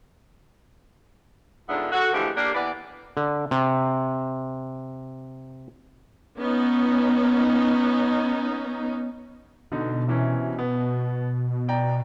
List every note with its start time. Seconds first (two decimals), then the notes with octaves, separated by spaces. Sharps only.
1.68 G#2 D3 B3 D4 F4 E5
1.92 F#4 A4
2.13 D3 E3 F3 G#3 A3 G4
2.37 A#3 D4 G4
2.54 E3 B3 B4 D5
3.17 D3
3.51 C3
6.38 B3 C#4 D#4
9.72 B2 D3 D#4
10.08 C3 E3 C#4
10.59 B3
11.68 D5 G5 A#5